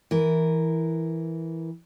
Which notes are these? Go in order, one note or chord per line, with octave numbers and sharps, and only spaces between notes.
E3 A#4